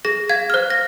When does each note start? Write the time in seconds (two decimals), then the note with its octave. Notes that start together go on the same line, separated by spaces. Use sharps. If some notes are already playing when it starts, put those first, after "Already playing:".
0.05 G#4 A#6
0.29 F5 G#6
0.50 F6
0.54 C5 F#6
0.70 A#6